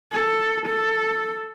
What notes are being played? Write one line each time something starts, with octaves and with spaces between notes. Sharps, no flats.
A4
A4